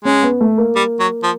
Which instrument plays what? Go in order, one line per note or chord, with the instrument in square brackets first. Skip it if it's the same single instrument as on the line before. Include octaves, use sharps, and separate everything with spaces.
[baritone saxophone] G#3 [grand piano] C#4
[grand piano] B3
A3
A#3
[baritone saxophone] G3
F#3
F3